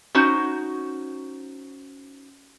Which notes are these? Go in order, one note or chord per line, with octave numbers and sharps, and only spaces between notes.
C#4 D#4 F#4 C5